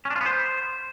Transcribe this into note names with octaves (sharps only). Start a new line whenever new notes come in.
C#4
D4
F4
B3
C5